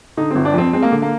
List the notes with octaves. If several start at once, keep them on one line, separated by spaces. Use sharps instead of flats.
D3 D#4
G1 C4
D4
F2 C4
G#3 C4
A#3
D3
A#3